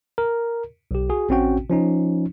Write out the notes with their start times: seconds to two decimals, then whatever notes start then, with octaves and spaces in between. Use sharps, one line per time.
0.18 A#4
0.91 B1 G4
1.09 F#4 G#4
1.29 A1 C4 C#4 F#4 G5
1.70 F3 C#4 D#4